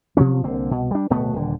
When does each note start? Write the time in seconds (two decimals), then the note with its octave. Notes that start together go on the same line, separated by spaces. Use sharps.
0.17 B2 F3 F#3 C#4
0.44 C2 D3 A#3 C4
0.69 C2 B2
0.91 G3 D4
1.10 D1 B2 A3 B3
1.34 D#1 D3